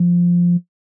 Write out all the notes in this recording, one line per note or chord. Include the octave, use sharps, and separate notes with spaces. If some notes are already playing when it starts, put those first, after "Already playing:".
Already playing: F3